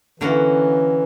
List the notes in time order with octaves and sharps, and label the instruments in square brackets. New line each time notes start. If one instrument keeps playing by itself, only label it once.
[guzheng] D3 A#3 C#4 F#4 [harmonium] E3